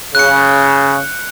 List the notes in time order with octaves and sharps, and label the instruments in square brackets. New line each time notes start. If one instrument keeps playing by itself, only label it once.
[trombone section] C#3 [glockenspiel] F#6 C#7